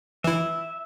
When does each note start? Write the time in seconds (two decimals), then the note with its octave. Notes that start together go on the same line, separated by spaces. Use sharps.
0.24 E3 E4 E5